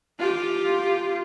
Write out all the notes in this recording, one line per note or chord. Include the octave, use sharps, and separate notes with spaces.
F4 G4